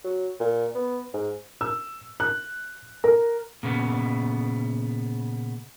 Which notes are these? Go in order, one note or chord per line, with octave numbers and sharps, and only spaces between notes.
F#3
A#2
B3
G#2
E6
F#6
A#4
A#2 C#3 B3